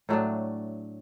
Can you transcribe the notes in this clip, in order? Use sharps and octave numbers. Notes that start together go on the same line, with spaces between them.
A2 F#3 A3 D4